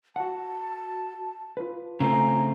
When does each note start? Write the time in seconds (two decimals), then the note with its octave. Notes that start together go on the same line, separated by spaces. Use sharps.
0.16 F#4 F#5 A5
1.57 F4 B4
2.00 C#3 A3 C4 C#4 F4 G#5 A#5